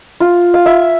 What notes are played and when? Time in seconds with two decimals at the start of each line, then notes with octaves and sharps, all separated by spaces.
0.20 F4
0.54 F5
0.66 E5